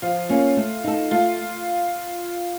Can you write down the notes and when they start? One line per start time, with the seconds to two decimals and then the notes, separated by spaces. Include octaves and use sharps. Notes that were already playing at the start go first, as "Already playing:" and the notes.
0.02 F3 F4
0.29 A#3 C#4 F4
0.57 A3
0.84 D#4 A4
1.11 A3 F4